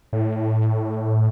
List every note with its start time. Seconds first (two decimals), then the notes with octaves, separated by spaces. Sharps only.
0.13 A2